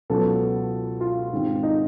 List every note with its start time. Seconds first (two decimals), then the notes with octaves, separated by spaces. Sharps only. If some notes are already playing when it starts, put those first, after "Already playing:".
0.10 C#2 B2 F#3 B3 A4
1.01 F4
1.32 G#2 D#3 G#3 C4
1.63 D#4